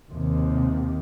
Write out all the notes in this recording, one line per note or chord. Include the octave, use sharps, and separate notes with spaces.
D#2 C3